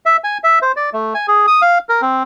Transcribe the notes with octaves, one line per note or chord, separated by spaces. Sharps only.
E5
G#5
E5
C5
D5
A3
G#5
G#4
D#6
F5
A#4
C4